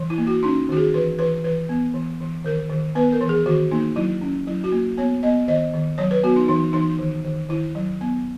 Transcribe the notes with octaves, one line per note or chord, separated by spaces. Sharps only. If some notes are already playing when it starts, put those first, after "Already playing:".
Already playing: E3
E4
A#3
F#4
C#4 D#4
D#3 F#4
G#4
E3 B4
E3 B4
E3 B4
B3
E3
E3
D#3 A#4
D#3
B3 B4
A#4
E3
G#4
D#3 F#4
A#3 D#4
F#3 E4
C#4
F#3 E4
F#4
A#3
B3 C#5
B3 D#5
D#3 D#5
D#3
F#3 C#5
B4
B3 F#4
D#4
E3 D#4
E3 D#4
D#3
D#3
D#3 E4
F#3
B3